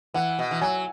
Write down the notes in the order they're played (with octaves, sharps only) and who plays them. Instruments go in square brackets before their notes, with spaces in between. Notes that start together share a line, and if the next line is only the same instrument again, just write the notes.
[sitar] E3 [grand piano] F#5
[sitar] B2
E3
[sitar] F#3 [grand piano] G#5